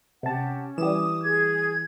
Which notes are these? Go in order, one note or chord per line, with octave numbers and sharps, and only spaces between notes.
C3 C#4 G4 F#5 A5
E3 G3 D6 D#6 E7
G#4 G#6